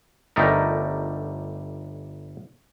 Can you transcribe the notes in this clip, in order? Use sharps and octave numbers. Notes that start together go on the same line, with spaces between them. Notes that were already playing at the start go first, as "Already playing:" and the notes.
G1 G3 A3 D#4 A#4